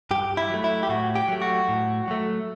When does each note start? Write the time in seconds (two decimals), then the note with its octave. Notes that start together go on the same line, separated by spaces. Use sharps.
0.11 G2 G4
0.37 E4
0.50 F#3 A3
0.64 E4
0.83 G4
0.89 A2 F#4
1.15 G4
1.28 F#3 A3
1.42 F#4
1.69 A2
2.08 F#3 A3